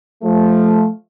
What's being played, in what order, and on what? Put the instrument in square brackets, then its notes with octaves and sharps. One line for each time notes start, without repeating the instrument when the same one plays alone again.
[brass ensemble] F3 A3